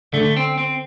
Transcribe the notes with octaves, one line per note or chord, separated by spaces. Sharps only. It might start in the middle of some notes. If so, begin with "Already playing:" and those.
D3 A3
C4
C4